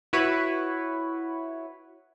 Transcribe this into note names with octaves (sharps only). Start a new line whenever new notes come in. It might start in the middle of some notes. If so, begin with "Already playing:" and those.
E4 F#4 B4 C#5